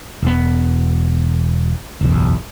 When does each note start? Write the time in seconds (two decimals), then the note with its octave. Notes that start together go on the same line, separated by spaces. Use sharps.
0.23 E1 B3
2.01 F#1 B1 E2